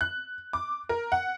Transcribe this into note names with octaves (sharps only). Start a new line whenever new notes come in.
F#6
D6
A#4
F#5